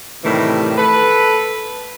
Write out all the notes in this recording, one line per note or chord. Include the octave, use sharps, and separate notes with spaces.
A2 C3 D#3 E3 G3
A4 B4